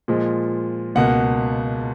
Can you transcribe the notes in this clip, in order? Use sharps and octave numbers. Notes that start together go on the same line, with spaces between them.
A#2 F3 G#3
C#2 B2 A#3 F#5